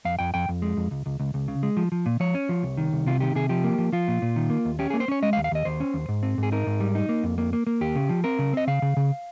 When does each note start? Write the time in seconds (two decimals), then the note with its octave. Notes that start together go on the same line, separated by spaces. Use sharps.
0.05 F2 F5
0.19 F2 G5
0.34 F2 G5
0.49 F2
0.62 G#3
0.77 F2
0.91 C#2
1.06 C#2
1.20 C#2
1.34 C#2
1.48 C#3
1.63 G#3
1.77 F3
1.92 F3
2.06 A#2
2.20 F3 C#5
2.35 C#4
2.49 F3
2.63 C2
2.77 D#3
2.93 C2
3.06 C3 F4
3.20 D#3 G4
3.35 C3 G#4
3.49 F3 G4
3.64 A#3
3.78 F3
3.93 F3 F4
4.08 A#2
4.22 A#2
4.36 D#3
4.50 A#3
4.65 D#2
4.79 C#4 G4
4.90 A#3 G#4
5.00 C5
5.08 C#4 C#5
5.23 G#3 D#5
5.33 F5
5.37 D#2
5.44 F5
5.51 D#2 D#5
5.65 D#2 C5
5.80 C#4
5.94 D#2
6.09 G#2
6.23 C4
6.38 G#2
6.43 G#4
6.52 D#4 A#4
6.67 G#2
6.80 G3
6.95 D#4
7.09 A#3
7.24 F2
7.38 A#3
7.53 A#3
7.67 A#3
7.81 D#2 G4
7.96 C#3
8.09 F3
8.24 C4 A#4
8.39 C#3
8.53 C4 D#5
8.67 C#3 F5
8.82 C#3
8.97 C#3